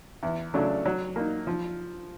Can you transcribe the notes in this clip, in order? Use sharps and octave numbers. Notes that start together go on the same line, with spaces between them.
E2
C#3 F#3 A3 D4
F#3
A#3 D#4
F3